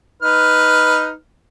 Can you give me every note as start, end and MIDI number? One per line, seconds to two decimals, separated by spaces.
0.22 1.11 63
0.22 1.11 71
0.22 1.11 89